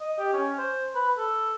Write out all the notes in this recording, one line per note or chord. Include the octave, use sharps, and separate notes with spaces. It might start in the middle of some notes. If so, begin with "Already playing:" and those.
D#5
G4
C#4
C5
B4
A4